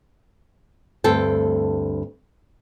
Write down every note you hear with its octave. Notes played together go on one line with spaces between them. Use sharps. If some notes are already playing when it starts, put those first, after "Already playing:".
D2 G2 C4 A4 G5